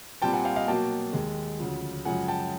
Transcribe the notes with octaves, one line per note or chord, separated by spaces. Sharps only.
A#2 G3 C4 G5 A5
F#5 G#5
F5 G5
D#5 F5
B2 F#3 A#3 G5 A5
D#2 D#3 G#3
D2 C#3 F3
F#2 C#3 F3 G#3 F#5 G#5
G5 A5